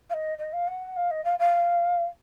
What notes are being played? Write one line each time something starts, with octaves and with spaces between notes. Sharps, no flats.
F5
D#5
D#5
F5
F#5
F5
D#5
F5
F5